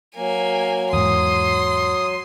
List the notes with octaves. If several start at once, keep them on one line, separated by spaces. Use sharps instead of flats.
F#3 A#3 G#5
E2 G#2 C6 D#6